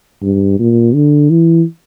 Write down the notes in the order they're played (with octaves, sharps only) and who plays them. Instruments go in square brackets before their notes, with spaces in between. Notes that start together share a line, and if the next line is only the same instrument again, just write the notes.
[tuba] G2
A#2
D3
E3